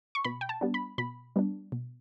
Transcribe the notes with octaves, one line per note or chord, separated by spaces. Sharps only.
C#6
B2 B5
G5
A5
G3 B3 D4
B5
B2 B5
G3 B3 D4
B2